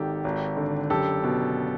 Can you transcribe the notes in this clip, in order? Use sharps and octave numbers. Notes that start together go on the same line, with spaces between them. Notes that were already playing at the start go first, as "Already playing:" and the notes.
Already playing: G#1 D#3 G4 A4
G#1
D3
F#1 G4 A4
B2